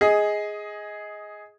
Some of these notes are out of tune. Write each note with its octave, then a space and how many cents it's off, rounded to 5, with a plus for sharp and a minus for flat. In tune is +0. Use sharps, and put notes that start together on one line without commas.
G#4 +0 D#5 +15